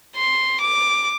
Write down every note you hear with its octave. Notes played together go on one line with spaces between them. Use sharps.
C6
D6